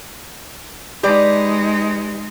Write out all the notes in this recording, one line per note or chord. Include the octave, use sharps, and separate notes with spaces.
G#3 D#4 G4 B4 D5